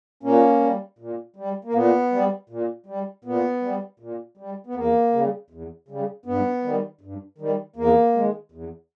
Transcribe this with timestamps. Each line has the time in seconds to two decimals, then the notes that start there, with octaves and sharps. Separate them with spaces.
0.23 A#2 A#3 C#4
0.61 G3
0.98 A#2
1.36 G3
1.64 A#3
1.74 A#2 B3
2.12 G3
2.49 A#2
2.86 G3
3.24 A#2 B3
3.62 G3
4.00 A#2
4.37 G3
4.66 B3
4.75 E2 A#3
5.13 C#3 G3
5.50 E2
5.88 C#3 G3
6.25 G2 B3
6.63 D#3 G3
7.01 G2
7.38 D#3 G3
7.76 E2 A#3
8.14 D#3 G#3
8.52 E2